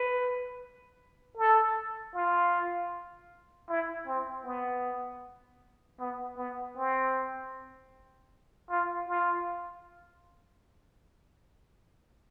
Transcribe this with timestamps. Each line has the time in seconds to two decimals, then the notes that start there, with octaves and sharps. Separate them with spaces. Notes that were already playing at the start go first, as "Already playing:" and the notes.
Already playing: B4
1.37 A4
2.14 F4
3.69 E4
4.07 C4
4.45 B3
6.00 B3
6.38 B3
6.77 C4
8.70 F4
9.08 F4